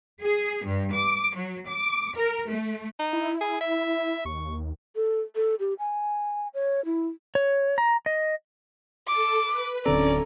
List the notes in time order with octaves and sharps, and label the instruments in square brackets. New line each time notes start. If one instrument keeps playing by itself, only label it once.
[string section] G#4
G2
D6
F#3
D6
A#4
A3
[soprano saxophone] D#4
[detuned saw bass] E4
[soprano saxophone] G#4
E5
[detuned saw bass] D#2 [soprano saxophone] C#6
[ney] A4
A4
G4
G#5
C#5
E4
[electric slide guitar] C#5
A#5
D#5
[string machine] A4 [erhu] D6
[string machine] B4
[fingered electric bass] D1 D3 C4 [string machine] C#4 [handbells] A4 A#5 [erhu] D5